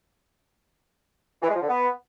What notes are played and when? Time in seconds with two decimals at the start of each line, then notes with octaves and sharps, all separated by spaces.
1.42 E3
1.49 G#3
1.55 F3
1.61 D3
1.68 B3